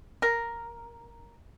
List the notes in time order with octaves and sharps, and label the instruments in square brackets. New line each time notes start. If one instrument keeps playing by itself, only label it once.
[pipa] A#4